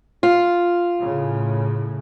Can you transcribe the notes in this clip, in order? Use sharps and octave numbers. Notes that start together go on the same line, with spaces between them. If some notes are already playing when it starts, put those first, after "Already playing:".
F4
A2 C#3